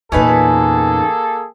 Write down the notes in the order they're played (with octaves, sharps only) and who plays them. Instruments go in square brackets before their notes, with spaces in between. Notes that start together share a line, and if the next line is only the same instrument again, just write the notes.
[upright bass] E2 A#2 [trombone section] A#3 G#4 A4 [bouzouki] C#4 D#4 B4